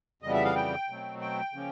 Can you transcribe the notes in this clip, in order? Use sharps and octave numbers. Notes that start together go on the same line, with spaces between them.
F2 C#3 E3 G3 B3 D#5
E5
F5
G5
B2 F#3 A3 C4
G5
C#3 F3 A#3 C#4